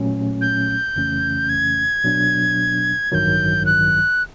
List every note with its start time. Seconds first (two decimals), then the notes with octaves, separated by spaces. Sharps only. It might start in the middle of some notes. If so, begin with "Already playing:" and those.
Already playing: A#2 F#3 A3 C#4
0.41 G6
0.96 F2 C#3 E3 A3 C#4
1.49 G#6
2.04 B2 F#3 B3 D4
3.11 A1 G2 D#3 F#3 G6 G#6
3.66 F#6